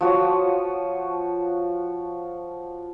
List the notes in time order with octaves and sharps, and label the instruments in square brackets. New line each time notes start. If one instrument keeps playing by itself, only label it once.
[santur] F3 F#4 C#5 D#6